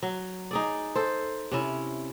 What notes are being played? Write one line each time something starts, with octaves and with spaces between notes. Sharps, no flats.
F#3
D#4 G#4 D5
A4 C5
C3 C#4 E4